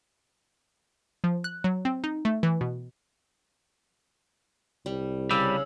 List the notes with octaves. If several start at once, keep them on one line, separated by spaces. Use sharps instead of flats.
F3
F#6
F#3
C4
D#4
A3
E3
B2
C2 G3
C#3 G3 F5 E6